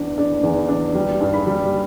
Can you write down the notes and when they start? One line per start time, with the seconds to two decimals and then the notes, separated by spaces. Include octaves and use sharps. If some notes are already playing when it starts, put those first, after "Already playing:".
Already playing: E2 D4
0.18 D4
0.43 E2
0.69 D4
0.95 G3
1.21 G2
1.33 B5
1.47 G3